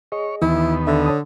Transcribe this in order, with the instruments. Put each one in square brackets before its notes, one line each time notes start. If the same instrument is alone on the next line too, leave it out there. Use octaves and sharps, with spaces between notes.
[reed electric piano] G#4 D#5 [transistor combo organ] C#5
[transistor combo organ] D#2 B3 [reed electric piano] E3 [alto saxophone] E4
[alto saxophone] D3 [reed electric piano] E5
[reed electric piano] C#5 A5 D#6